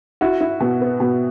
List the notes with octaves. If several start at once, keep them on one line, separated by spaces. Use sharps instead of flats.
E4 F#4
E4
B2
B3
B2